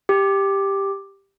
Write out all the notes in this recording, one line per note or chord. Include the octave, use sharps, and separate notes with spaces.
G4